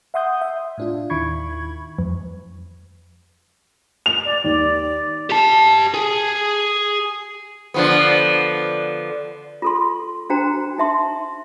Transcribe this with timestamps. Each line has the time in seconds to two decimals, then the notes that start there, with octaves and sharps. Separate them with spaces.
0.14 E5 F#5 C6 D#6 G6
0.41 E5
0.78 A2 D4 F4
1.10 D#2 D#3 E4 B5 C#6 G#6
1.99 F2
4.06 F7
4.25 D5
4.44 D#2 D5
5.30 G4 A5
5.94 G#4
7.74 D3 F3 B3
9.62 F4 A4 C6
10.30 D4 F#4 C5 G5 A#5
10.78 D#4 E5 C6